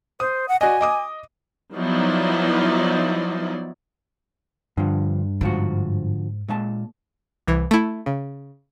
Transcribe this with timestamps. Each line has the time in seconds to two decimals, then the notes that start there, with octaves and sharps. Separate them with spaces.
0.20 C5 D#6
0.48 F#5
0.61 F#4 D5 D#5 G#5
0.81 D#5 D6 D#6
1.76 F3 F#3 B3 D#4 E4 D5
4.77 G2 D3 F3
5.41 G#2 D3 F3 F#4
6.49 A#2 G#3 A5
7.47 C2 E3
7.71 A3 E4
8.06 C#3